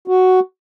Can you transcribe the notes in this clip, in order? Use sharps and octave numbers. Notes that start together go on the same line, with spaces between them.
F#4